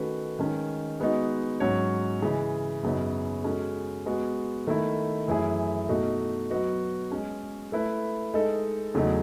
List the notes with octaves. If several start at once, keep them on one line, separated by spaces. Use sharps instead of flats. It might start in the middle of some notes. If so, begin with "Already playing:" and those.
Already playing: D#3 A3 C#4 F#4 B4
D#3 G#3 C#4
G#3 B3 D#4 F#4
G#2 F#3 C#4 F#4 C#5
C#3 E3 G#3
F#2 C#3 F#3 B3 D#4
G#3 C#4 F#4 A4
G#3 B3 F#4
D#3 A3 E4
F#2 E3 A3 E4 G#4
B2 A3 D#4 F#4
F#3 B3 F#4 B4 D#5
G#3 C#4 G#4
A3 E4 B4
G#3 D#4 A4
E2 C#3 F#3 A3 D#4